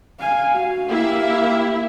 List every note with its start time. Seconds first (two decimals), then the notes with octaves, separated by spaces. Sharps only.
0.19 F5 G#5
0.55 F#4 F5
0.90 A#3 E4 G4 E5